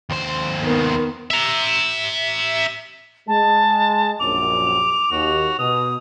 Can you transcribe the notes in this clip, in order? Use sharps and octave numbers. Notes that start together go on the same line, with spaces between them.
D#2 C5
D#3 B3
E5 A#5
G#3 A5
A#1 F#2 D6 F7
D#2 F#4
B2 D#6